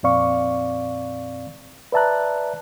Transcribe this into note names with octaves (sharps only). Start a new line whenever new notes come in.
F2 A#2 C4 D5 F5 C#6
B4 D5 E5 A5 A#5 F#6